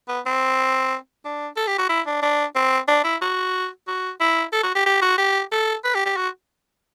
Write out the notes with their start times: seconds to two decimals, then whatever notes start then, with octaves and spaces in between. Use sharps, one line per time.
0.09 B3
0.26 C4
1.25 D4
1.56 A4
1.67 G4
1.79 F#4
1.89 E4
2.06 D4
2.22 D4
2.55 C4
2.88 D4
3.04 E4
3.22 F#4
3.88 F#4
4.20 E4
4.52 A4
4.63 F#4
4.75 G4
4.86 G4
5.02 F#4
5.18 G4
5.52 A4
5.84 B4
5.95 G4
6.06 G4
6.17 F#4